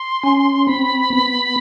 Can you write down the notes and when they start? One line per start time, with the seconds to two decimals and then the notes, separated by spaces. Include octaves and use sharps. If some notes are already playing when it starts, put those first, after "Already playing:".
Already playing: C6
0.23 C#4
0.67 C4 B5
1.10 B3